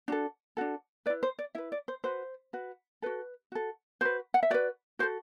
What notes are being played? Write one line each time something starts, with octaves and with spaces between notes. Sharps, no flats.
D4 F#4 A4
D4 F#4 A4
E4 B4 D5
C5
D5
E4 B4 E5
D5
C5
F#4 B4 C5
F#4 B4
F#4 A4 B4
F#4 A4
F#4 B4 C5
F#5
E5
F#4 B4 D5
F#4 A4 C5